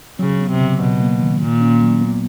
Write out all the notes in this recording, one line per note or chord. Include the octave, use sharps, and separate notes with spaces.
C#3 F#3
B3
C3
C#3
B2 F#3
A#3
D#3
A#2 A#3
C#4
F#3
B3